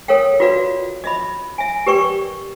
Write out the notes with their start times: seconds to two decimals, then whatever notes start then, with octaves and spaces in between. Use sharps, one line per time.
0.08 A4 A#4 C#5 F5 G5
0.40 F4 F#4 B4 D5 F5
1.04 D#5 E5 B5
1.58 E5 G#5
1.87 G4 A#4 B4 D5 G5 C#6